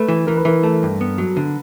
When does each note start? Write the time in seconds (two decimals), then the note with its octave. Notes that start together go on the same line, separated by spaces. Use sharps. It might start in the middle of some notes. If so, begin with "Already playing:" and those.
Already playing: A3 B4
0.08 E3
0.27 E3 A#4
0.37 B4
0.45 E3 A#4
0.63 A3 A4
0.83 G2
1.01 B3
1.18 F#3
1.37 D3